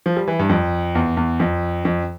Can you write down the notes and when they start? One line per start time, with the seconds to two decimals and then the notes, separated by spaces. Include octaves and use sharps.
0.06 F3
0.17 G3
0.28 E3
0.39 G2
0.49 F2
0.95 E2
1.17 E2
1.40 F2
1.85 F2